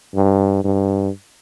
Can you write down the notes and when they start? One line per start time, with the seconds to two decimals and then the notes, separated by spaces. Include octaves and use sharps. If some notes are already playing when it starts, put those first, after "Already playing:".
0.15 G2
0.64 G2